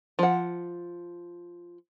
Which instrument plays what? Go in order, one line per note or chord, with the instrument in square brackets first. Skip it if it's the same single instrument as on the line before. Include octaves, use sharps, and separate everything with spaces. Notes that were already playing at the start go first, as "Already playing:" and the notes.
[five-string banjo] F3 F#5